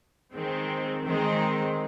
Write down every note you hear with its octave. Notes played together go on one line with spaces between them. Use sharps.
D#3 G#3 C4
D#3 G#3 C4 D#4